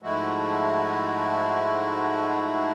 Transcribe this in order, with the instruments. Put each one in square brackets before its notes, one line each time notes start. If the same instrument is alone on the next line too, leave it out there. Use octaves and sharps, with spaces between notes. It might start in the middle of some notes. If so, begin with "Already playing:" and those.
[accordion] G#2 F3 G#3 A3 E4 F#4